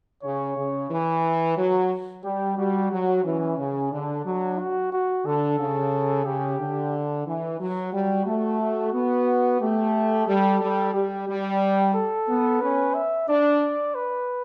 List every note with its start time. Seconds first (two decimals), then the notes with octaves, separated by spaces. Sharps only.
0.23 C#3 C#5
0.57 C#3
0.90 E3
1.57 F#3
2.24 G3 G4
2.58 G3 F#4
2.91 F#3
3.24 E3 C#4
3.58 C#3
3.92 D3 D4
4.25 F#3
4.58 F#4
4.92 F#4
5.25 D3 A4
5.59 C#3
6.26 C#3 G4
6.59 D3
7.26 E3
7.60 F#3
7.92 G3 F#4
8.26 A3
8.61 F#4
8.94 B3
9.61 A3 G4
10.27 G3 A4
10.61 G3
10.94 G3 G4
11.27 G3
11.94 A4
12.28 B3
12.61 C#4 B4
12.95 E5
13.28 D4 D5
13.95 B4